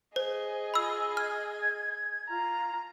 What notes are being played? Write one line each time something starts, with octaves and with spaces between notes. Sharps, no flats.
G#4 C5 D#5
F4 B5 E6
F6 G#6
F4 A#5